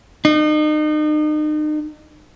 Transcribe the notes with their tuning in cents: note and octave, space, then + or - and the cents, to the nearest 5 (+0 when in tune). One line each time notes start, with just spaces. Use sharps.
D#4 -35